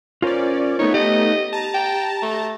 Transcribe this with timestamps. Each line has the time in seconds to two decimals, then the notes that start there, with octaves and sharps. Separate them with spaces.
0.22 C#4 F4 A#4 C5 D5
0.79 A3 B3 D#4 C#5
0.94 G4 D#5
1.53 A5 A#5
1.74 G5
2.22 A3